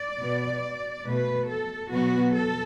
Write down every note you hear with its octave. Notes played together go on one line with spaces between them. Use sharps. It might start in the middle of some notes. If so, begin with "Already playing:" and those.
Already playing: D5
B2 B3
B2 A3 B4
A4
B2 F#3 B3 F#4
A4